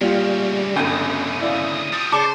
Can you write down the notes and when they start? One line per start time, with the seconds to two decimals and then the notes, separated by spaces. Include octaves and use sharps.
0.01 D2 A#2 C#3 G3 F4 G4
0.76 G1 C2 F#2 G5 D#6
1.41 E4 D5 F5
1.92 F3 G3 A6
2.12 C#3 C5 D5 A5 C#6 D6 E7